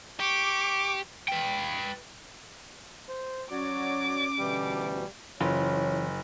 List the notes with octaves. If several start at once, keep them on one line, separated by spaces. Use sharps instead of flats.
G4 C#6 D6
B4 G5
C5
F#3 C#4 F#4 C#5 D5 D6
D2 B2 E3 G3
F#1 E3 C#4 F4 C#5